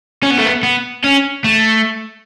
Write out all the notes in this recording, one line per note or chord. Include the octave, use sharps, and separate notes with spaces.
C#4
B3
A3
B3
B3
C#4
A3